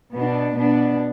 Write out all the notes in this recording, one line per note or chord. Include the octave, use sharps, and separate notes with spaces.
B2 B3 D4
B2 B3 D4